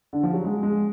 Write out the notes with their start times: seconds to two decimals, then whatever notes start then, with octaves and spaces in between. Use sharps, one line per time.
0.13 D3
0.23 F3
0.34 F#3
0.44 G#3
0.63 G#3